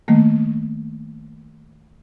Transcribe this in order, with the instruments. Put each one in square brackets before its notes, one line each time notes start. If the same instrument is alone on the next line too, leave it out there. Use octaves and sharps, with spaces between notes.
[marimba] D#3 G3 A3 A#3